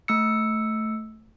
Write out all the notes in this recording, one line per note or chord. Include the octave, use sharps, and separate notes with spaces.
A3 E6 C#7